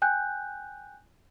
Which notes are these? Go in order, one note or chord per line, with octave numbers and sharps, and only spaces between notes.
G5 G#5 F#6 G6